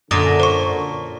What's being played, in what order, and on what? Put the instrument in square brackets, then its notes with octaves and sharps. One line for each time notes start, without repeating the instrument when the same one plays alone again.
[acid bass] F#2 [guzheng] A#2 [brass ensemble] D3 [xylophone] D#6 A#6
[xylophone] C5 C#6